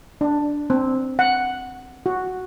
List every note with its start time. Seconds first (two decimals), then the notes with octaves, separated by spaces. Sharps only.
0.21 D4
0.70 C4
1.19 F#5
2.06 F#4